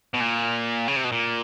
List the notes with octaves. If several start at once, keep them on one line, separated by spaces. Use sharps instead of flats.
B2
A#2
C#3
C3
B2
A#2